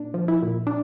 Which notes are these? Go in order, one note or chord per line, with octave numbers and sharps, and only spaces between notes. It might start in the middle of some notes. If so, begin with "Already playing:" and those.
Already playing: A#2 D4
F3
E4
A#2
D4